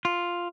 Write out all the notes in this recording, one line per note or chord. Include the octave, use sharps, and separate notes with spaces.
F4